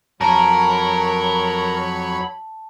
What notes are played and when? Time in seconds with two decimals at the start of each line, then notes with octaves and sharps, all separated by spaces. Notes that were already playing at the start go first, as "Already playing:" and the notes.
0.21 F2 F#3 A#4 C#5 A5 B5 C#7